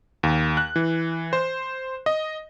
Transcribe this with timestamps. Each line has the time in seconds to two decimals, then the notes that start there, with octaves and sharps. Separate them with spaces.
0.23 D#2
0.57 F#6
0.76 E3
1.33 C5
2.06 D#5